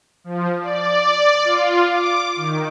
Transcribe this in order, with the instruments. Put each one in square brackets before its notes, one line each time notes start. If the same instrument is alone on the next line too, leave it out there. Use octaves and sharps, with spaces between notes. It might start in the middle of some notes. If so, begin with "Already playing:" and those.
[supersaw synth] F3
D5
F4
D6
D#3